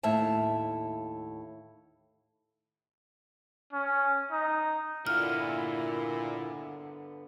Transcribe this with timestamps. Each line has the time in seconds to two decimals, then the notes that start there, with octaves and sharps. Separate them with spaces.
0.03 D#2 A2 E5 F5 A5
3.73 C#4
4.31 D#4
5.07 A#2 D3 B3 E4 F6